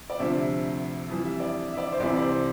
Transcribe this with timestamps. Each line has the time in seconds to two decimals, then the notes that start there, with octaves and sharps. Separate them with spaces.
0.10 D5
0.19 D2 C3 F3 E5
1.09 F2 E3 G3
1.25 E5
1.40 D5
1.73 E5
1.78 D5
1.92 C5
2.00 C2 C3 E3 D5
2.16 D5
2.22 C5